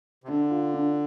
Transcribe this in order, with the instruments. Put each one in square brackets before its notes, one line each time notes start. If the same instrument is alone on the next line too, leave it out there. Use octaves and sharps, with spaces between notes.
[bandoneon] C3
[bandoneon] D3 [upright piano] D4
[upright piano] F4
D4